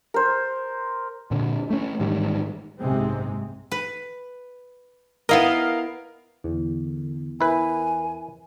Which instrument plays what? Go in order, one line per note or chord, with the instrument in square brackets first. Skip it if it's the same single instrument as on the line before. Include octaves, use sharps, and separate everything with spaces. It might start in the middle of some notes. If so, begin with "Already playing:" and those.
[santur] A#4 C5
[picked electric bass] A#2 D3
A3 C#4
A1 G#2 D#3 G3
[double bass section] F#1 B1 G#2 C3 G#3 C4
[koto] B4
[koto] B3 E4 D#5 [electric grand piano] A#4 F5
[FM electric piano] E2 [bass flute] D3
[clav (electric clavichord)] E4 B4 [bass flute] A#4 [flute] G#5